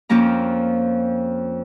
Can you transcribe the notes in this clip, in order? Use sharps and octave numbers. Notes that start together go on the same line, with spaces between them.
F2 F3 A#3 C#4 A#5